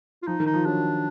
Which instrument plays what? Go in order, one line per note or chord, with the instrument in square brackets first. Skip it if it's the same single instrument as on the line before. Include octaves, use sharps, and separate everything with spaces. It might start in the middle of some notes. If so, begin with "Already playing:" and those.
[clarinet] F4
[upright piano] F3 [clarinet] D#4
[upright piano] D#3
[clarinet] D#4
[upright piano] F3
[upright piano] F#3 [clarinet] D4